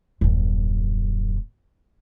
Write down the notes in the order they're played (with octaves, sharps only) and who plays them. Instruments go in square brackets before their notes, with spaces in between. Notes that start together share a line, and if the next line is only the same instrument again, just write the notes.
[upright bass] D#1 F#2